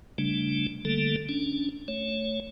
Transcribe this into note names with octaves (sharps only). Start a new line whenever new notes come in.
C#3 G3 A3 D4
D3 G3 A3 A#3 A4
C#4 D4
A3 C#5